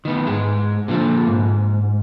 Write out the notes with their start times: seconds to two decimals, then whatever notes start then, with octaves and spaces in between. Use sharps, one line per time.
0.05 D#3 B3
0.27 G#2 G#3
0.88 A#2 D3 D#3 F3
1.27 G#2